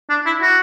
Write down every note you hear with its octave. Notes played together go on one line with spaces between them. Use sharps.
D4
E4
F#4